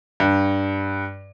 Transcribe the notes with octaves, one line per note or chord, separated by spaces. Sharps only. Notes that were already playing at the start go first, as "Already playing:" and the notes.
G2